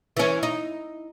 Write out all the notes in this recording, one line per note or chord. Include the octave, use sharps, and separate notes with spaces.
E3 C#4
D#4